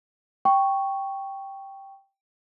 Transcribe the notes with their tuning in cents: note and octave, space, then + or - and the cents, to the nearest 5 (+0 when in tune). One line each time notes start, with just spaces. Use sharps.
G5 +0 C#6 +0